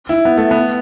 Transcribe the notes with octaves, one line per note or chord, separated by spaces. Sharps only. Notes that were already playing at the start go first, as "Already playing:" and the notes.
E4
B3
A3
B3